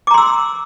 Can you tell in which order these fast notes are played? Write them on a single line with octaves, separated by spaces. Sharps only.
D6 A#5 C6 E6